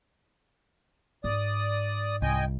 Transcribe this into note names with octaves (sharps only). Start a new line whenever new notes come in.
G#2 D5 D#6
C2 D#5 G5 G#5